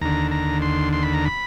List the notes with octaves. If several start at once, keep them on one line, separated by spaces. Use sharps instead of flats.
D#2 D3 A#5
A#5
C6
C6
B5
A#5
B5